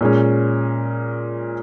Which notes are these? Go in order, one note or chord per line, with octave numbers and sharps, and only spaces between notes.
A#2 G#3 C#4